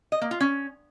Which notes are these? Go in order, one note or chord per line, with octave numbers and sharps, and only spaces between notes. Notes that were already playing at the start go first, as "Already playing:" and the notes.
D#5
A#3
F4
C#4